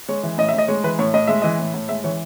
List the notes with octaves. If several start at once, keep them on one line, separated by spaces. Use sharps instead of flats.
G#3 C#5
E3
A2 D#5
E5
A2 D#5
G#3 C#5
E3 B4
A2 C#5
A2 D#5
G#3 E5
E3 D#5
A2
A2
G#3 E5
E3 C#5